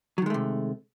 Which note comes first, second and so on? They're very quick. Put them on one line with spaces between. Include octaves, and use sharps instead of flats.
F#3 D#3 G#3 A3 C3